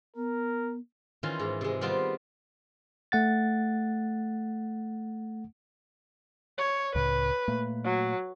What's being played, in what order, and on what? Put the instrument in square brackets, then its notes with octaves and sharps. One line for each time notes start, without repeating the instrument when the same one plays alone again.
[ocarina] B3 [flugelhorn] A#4
[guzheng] D#3 E3 C#4 F4
G#2
C3 G#3
D#3 G3 B3 C4 F4
[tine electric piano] A3 F#5 A6
[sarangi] C#5
[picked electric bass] C#2 A2 C#3 [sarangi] B4
[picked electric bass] A#2 A3 A#3
[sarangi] F#3